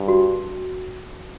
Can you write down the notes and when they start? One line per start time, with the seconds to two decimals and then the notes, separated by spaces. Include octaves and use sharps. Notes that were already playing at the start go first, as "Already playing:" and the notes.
Already playing: G2
0.08 F#4